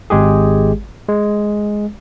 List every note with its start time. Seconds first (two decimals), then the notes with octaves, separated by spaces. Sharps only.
0.10 G#1 G#3 G4 G#4
1.09 G#3